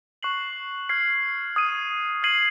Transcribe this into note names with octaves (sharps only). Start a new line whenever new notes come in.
C#6 F#6 C7 F#7
F6 G#6 C7
D#6 G#6 D#7
F6 G#6 C7 D#7 F#7